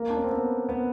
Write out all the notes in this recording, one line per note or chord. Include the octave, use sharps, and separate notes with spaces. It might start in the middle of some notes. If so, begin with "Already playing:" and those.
Already playing: A#3
D4
C#4
C4
B3
B3